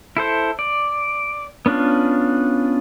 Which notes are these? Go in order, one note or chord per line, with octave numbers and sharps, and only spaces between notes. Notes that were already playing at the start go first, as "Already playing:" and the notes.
E4 A4 C5
D5
B3 C#4 D4 F4